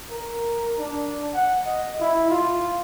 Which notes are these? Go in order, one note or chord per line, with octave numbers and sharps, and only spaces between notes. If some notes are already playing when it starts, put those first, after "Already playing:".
A#4
D4
F#5
D#5
E4
F4